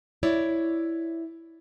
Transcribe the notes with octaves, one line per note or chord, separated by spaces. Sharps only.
E4 C#5 D5